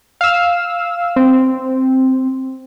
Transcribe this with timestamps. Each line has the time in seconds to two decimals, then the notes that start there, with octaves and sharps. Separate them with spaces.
0.21 F5 E6
1.16 C4